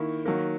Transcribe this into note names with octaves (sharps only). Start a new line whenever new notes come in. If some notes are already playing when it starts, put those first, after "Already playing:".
Already playing: D#3 A#3 E4 C#6
D#3 F#3 A#3